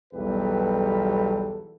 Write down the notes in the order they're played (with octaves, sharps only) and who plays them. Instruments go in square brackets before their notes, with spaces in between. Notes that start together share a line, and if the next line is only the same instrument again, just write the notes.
[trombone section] B1 E2 G3 G4 A4 B4